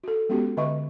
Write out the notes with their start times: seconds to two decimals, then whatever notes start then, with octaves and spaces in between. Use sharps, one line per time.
0.04 F#4 A4
0.29 G#3 B3 C#4 F#4 G4
0.57 D3 B4 D#5 E5 C#6